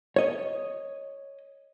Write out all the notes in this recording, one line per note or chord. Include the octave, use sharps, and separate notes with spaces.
C#5 D#5